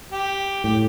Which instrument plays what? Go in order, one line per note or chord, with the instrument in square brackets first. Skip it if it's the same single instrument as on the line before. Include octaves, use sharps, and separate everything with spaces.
[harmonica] G4
[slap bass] A2 [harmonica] G4